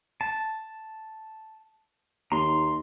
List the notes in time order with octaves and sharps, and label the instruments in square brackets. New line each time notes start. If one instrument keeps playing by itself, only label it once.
[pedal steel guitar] A5
[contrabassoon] D#2 [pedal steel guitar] A#5 C6